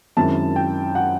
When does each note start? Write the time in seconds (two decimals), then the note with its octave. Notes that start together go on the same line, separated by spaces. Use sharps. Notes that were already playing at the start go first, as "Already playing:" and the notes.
0.17 F#2 D#3 G#3 C4 E4 A5
0.56 G5
0.95 F#5